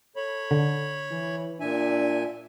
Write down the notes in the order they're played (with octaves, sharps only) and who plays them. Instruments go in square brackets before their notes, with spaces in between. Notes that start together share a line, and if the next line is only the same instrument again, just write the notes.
[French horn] A4 [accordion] C#5 B5
[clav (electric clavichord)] D3
[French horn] E3
[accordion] A#2 E5 G#5 [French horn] D4